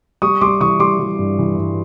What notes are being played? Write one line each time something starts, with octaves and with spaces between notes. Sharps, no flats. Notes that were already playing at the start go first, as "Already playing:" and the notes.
G3 C#6 D#6
G3 C6 D6
E3 C#6 D#6
G3 C6 D6
G3
G2
E3
G2